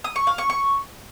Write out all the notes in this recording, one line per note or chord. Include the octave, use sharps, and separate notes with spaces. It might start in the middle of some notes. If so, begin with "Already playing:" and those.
D#6
C#6
F5
C#6
C#6